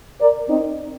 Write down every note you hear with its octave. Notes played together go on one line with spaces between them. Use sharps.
A#4 D5
C4 D#4